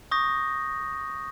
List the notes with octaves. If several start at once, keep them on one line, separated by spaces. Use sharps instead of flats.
C#6 D#6 G6 A#6